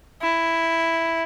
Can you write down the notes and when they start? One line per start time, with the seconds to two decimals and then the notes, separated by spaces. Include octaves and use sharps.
0.22 E4